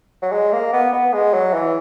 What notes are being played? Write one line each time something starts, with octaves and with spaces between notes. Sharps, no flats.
F#3
G#3
A#3
B3
B3
G#3
F#3
E3